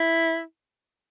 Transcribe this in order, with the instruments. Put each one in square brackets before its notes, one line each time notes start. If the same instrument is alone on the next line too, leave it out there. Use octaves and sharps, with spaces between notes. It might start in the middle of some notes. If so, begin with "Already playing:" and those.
Already playing: [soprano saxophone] E4